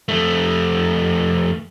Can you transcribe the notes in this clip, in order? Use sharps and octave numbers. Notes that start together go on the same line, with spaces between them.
F2 A3